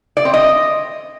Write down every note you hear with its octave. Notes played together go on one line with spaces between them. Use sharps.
D5
C4
D#5